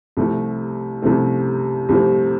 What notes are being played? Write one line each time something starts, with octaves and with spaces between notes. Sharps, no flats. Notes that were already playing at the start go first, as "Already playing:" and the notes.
C2 C3 F3 A3 C4
C2 C3 F3 A3 C4
C2 C3 F3 A3 C4